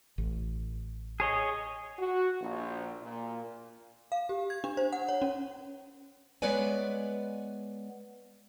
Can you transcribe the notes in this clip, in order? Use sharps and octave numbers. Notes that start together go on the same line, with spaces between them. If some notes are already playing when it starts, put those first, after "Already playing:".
A1
G#4 C#5 D#5
F#4
A#1
A#2
F5
G4
G#6
D4
C5
F#5
C#5
C#4
G#3 B3 B4 C#5 D5 G#5